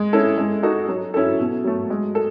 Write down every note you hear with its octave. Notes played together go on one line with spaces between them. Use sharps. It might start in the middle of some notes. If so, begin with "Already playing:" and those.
Already playing: G#3
C#4 E4 A4
G#3
D#4 F#4 A4
F#3
C#4 E4 A4
B2
F#3 A3
G#3
A4